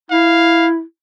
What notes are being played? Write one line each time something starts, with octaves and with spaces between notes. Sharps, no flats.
E4 F5